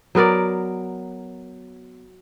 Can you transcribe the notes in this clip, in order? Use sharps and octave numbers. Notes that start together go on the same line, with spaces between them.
F#3 B3 A#4 D5